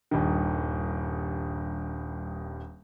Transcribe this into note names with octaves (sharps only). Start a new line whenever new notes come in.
D#1 G2 D#3